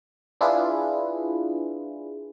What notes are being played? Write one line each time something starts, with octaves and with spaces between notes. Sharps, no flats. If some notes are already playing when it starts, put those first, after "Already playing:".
D4 E4 F4 G#4 B4